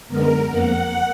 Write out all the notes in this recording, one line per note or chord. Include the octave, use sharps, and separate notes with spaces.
F#2 D3 G#3 B3 A#4
F2 F3 A#3 F#5